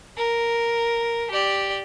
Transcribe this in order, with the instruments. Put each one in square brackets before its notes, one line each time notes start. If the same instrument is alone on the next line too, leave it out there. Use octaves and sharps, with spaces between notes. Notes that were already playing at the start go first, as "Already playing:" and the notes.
[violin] A#4
G4 D5